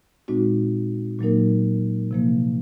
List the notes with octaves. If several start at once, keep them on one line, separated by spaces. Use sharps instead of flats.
A#2 G#3 C4 D#4 F#4
A#2 F#3 A#3 D#4 A#4
C3 F3 A#3